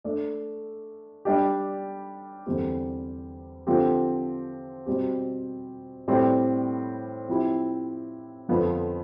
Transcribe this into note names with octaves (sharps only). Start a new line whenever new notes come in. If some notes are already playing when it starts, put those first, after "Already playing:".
A3 D4 A4 D5
G3 D4 G4
E2 D3 G3 C4 G4
D3 F3 C4 G4
B2 G3 C4 G4
A2 G3 C4 G4 D5
F3 C4 E4 G4
F2 D3 F3 B3